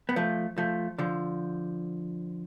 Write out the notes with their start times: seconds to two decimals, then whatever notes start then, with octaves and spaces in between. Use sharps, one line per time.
0.09 B3
0.16 F3 A3
0.58 F3 A3
0.98 D3 F3